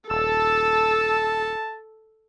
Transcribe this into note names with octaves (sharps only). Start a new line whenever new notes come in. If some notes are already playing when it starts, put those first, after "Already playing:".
D#1 A4 A5 E6